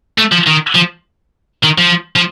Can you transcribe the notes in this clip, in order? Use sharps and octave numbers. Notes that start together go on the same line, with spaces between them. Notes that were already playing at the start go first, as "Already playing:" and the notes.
A3
F3
D#3
F3
D#3
F3
F3